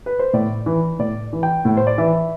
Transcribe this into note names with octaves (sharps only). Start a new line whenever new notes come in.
B4
C5
A2 D5
E3
A2 D5
E3
G5
A2
C5
D5
E3 E5